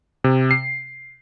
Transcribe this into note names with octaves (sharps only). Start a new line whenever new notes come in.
C3
C7